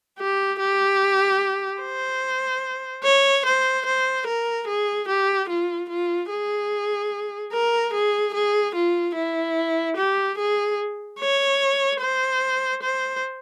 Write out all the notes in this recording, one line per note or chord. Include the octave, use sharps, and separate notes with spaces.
G4
G4
C5
C#5
C5
C5
A#4
G#4
G4
F4
F4
G#4
A#4
G#4
G#4
F4
E4
G4
G#4
C#5
C5
C5